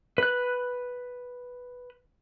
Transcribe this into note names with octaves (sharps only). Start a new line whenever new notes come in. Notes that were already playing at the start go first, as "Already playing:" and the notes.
B4 F#6